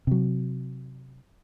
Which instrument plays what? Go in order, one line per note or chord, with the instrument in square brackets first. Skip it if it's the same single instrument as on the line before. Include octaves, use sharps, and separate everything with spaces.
[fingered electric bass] C3 F#3